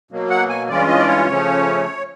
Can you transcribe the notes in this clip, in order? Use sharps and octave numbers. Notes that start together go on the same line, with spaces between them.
B2 F#3 A#3
F#5
G#5
G2 E3 G#3 C#4 F4 D5
D#5
D5
C#5
C#3 F3 A3 C#4